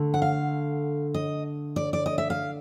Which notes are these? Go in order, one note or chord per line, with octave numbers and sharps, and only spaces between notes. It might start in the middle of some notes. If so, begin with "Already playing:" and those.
Already playing: D3 A3
F#5
F5
D#5
D5
D5
D#5
E5
F5